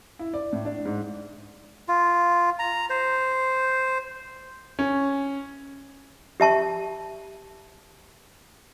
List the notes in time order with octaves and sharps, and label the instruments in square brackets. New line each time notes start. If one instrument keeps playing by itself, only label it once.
[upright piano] E4
D5
A2
D4
G#2
[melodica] F4
A#5
C5
[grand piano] C#4
[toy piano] G4 E5 A5 C#6